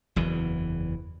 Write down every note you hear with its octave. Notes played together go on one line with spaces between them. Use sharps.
F#1 E2 E3